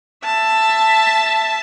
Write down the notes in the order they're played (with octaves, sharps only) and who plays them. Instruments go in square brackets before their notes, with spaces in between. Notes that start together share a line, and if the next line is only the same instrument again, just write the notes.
[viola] E5 A5